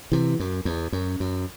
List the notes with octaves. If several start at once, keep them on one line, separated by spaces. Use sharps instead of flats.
C3 E3
F#2
E2
F#2
F#2